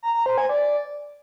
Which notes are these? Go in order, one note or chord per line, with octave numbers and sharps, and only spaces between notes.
A#5
A#5
C5
G#5
D5